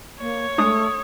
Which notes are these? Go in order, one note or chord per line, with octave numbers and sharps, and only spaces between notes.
A#3 C#5
G#3 A3 D4 D#6